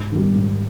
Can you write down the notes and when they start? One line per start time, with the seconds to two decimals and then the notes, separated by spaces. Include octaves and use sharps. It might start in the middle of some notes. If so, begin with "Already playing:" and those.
Already playing: G#2
0.12 D#3 G3
0.35 G#2